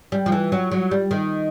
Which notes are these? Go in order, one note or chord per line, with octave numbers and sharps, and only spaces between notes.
G3
F3
E3
F#3
F#3
G3
D#3